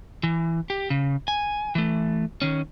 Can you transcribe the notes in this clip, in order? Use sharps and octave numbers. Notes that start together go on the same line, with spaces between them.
E3
G4
C#3
G#5
E3 A3
D#3 C#4